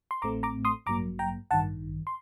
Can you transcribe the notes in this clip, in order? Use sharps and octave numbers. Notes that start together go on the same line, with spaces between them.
C6
A1 A2 A3 C4 A#5 D6
A#5 D6
C6 D#6
A1 G2 F#3 A#3 A#5 D6
G5 A#5
A1 G2 D#3 F#5 A5
C6